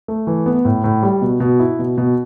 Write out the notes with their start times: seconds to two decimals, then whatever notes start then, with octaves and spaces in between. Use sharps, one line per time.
0.08 A3
0.27 E3
0.46 B3
0.65 A2
0.84 A2
1.03 G3
1.22 B2
1.40 B2
1.60 E4
1.79 B2
1.98 B2